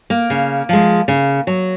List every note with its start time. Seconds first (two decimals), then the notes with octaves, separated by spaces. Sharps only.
0.10 A#3
0.30 C#3
0.69 F3 G#3
1.08 C#3
1.47 F#3